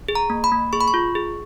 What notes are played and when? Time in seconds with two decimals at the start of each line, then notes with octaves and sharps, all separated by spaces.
0.09 G#4
0.15 A#5
0.30 A#3
0.44 B5
0.52 A#3
0.73 G#4 C#6
0.80 B5
0.88 C#6
0.94 F4
1.15 G#4